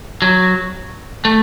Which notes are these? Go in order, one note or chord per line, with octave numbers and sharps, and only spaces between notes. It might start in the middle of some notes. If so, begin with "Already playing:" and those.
F#3
A3